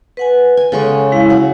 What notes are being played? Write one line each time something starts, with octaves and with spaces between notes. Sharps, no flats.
B4 F#5 G#5
G#5
C#3 G#3 A4 F#5 C#6
G#3 E4 F5
F#3 F#5